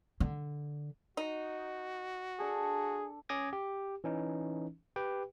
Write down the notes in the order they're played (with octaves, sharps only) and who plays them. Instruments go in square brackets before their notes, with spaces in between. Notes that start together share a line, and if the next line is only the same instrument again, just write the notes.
[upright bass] D3
[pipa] D#4 [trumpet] F#4
[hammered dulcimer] D4 A4 [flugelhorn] G#4
[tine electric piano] C#4 G#5 D6 D#6 G#6 A#6
G4
E3 C#4 D#4
G4 B4 G5